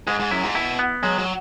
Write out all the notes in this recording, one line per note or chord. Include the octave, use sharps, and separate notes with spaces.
G#2 G#3
G#2
F#2 E4
G#2
B2 E4
B3
F#3 G#3
F#3